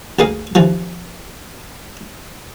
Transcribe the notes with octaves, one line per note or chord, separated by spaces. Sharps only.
D2 A#3 G#4 F5
D#2 E3 F3